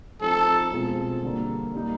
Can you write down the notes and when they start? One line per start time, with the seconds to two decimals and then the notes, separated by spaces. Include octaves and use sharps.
0.21 F3 A3 C4 D#4 A4
0.72 B2 G#3 C4 F4 G#4
1.23 D3 G3 A#3
1.73 G3 A#3 D#4